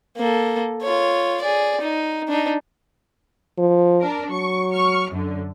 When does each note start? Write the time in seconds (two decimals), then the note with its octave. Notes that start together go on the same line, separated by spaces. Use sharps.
0.17 A#3 A4
0.83 F4 C#5
1.42 G#4 D5
1.80 D#4
2.28 D4 D#4
3.58 F3
4.00 D4 A#4
4.31 F#3 C#6
4.71 C#6 F6
5.10 F#2 D3